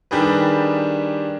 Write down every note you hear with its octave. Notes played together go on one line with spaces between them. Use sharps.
D#3 G3 D4 G4 G#4 B4